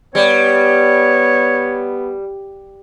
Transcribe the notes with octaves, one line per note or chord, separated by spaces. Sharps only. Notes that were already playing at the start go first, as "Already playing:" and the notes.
G3 B3 C#5